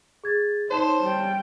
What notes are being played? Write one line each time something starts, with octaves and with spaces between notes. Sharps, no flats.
G#4 G#6 A6
D#4 C5 C#5 A5 E7
G3 G5